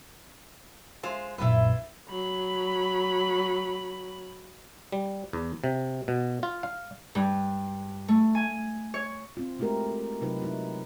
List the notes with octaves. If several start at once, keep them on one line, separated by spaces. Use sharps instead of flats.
G#3 F4 C5
A#1 F#2 E4 F4 B4
F#3 B5
G3
E2
C3
B2
F4
F5
G2
A3
G#5
C#5
C4 F4
G#3 A3 E4 F4 G4 A#4
C3 F#3 D#4 F4 B4
D#4 E4